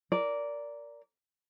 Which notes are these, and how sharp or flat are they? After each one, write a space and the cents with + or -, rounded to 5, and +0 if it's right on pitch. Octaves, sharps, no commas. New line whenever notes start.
A#4 +0 D5 -15